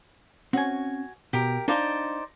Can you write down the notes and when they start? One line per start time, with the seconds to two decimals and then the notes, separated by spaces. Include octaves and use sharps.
0.53 C4 C#4 F#4 G#5
1.33 B2 G4 A#4
1.68 D4 D#4 C5 D5 F5 A5